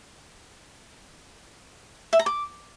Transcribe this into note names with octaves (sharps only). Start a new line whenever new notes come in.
E5
A#5
D6